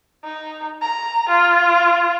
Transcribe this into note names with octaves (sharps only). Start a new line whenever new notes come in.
D#4
A#5
F4